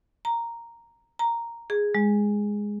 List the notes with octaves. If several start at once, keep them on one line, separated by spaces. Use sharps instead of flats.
A#5
A#5
G#4
G#3